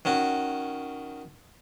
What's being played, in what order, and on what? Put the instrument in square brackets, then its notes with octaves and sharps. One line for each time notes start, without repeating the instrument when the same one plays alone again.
[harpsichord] D#3 C#4 F#4